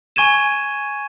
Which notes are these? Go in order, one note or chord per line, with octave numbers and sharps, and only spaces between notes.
G#5 C#6 G#6 D#7 E7